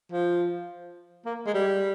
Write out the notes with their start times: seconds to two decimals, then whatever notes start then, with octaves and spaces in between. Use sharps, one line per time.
0.12 F3
1.25 A#3
1.47 G#3
1.54 G3